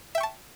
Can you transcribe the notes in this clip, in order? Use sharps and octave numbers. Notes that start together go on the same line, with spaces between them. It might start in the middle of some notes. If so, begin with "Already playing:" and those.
E5 G5 A5 C#6